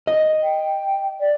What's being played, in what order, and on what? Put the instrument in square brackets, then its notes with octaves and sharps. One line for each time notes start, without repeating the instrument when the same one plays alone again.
[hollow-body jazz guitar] D#5
[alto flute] G5
D5